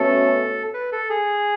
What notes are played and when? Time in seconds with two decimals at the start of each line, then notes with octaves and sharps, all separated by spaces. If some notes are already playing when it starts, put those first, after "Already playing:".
Already playing: B2 A3 C#4 A4
0.74 B4
0.92 A4
1.10 G#4